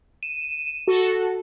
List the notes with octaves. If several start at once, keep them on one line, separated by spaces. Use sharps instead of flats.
D#7 E7
F#4 A4